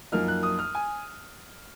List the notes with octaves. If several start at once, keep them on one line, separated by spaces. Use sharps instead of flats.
F#2 F3 A#3 D#4 F6
F#6
D#6
F6
G#5